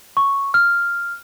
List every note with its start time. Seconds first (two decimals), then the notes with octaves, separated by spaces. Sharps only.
0.17 C#6
0.54 F6